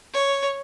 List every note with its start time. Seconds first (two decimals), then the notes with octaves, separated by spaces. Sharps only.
0.14 C#5